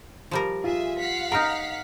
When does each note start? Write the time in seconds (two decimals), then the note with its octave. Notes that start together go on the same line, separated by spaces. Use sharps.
0.31 F3 G3 A#4
0.64 F4 G#4 E5
0.98 F5 F#5 B6
1.32 D#4 A#4 A#5 F6